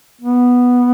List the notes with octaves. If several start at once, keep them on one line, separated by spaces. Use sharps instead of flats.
B3